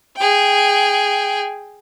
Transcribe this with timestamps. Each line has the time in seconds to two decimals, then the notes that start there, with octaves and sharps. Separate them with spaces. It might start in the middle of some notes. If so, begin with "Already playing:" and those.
0.17 G#4 G5